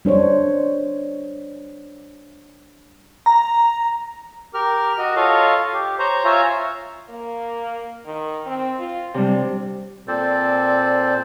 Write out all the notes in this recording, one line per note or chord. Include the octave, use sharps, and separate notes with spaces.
G3 D4 C5 C#5
A#5
G4 A#4 F6
F#4 D#5
F4 A4 C#5 D#5 F5
G4
C5 C#5 A#5
F4 C#5 E5 G#5 A#5
A#3
D#3
C4
F4
C3 G3 D4
A#2 C4 A4 C5 D5